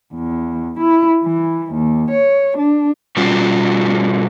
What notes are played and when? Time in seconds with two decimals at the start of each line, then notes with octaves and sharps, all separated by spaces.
0.14 E2
0.80 E4
1.24 E3
1.73 D#2
2.11 C#5
2.58 D4
3.16 B2 G3 C#4 F4 F#4